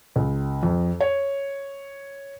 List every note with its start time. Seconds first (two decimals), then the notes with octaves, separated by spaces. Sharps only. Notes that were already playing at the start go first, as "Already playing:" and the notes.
0.16 C#2
0.63 F2
1.01 C#5